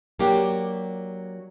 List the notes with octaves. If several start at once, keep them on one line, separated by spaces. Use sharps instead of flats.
F#3 A#3 D4 F#4 G4